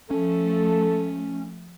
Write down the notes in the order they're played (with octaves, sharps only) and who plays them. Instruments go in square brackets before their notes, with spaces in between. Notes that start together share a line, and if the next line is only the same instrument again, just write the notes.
[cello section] F3 A3 [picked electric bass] C#4 [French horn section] A4